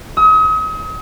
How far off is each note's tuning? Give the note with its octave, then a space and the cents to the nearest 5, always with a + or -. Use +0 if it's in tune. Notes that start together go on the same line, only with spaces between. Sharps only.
D#6 +40